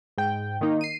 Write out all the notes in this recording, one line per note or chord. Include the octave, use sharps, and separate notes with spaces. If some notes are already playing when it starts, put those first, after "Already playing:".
G#2 G5
D#3 A#3 D#4
C7 D#7